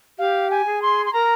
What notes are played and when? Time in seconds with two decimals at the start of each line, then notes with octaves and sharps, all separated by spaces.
0.19 G4 F5
0.50 G#5
0.66 G#4
0.82 C6
1.06 C6
1.13 A#4 A#5